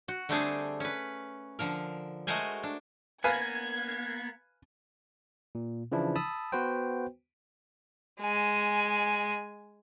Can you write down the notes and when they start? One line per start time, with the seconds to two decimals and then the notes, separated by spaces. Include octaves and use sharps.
0.08 F#4
0.29 D3 G3 A3 C4 D4 G#4
0.80 C#4 B4
1.59 D3 F3 A#4
2.27 G#3 A3 F#4 A#4 C5 G#5
2.63 D4
3.24 A#3 B3 B4 F5 G#5 G#6
5.55 A#2
5.92 C#3 E3 F3 D4 E4
6.15 A5 B5 D#6 E6
6.52 B3 F#4 B4 C5 G5
8.21 G#3 G#5